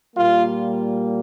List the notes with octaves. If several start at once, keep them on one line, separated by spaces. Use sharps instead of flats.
A#2 G3 A#3 F4